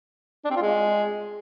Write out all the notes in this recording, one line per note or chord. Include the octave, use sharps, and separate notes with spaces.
D4
C4
F4
G#3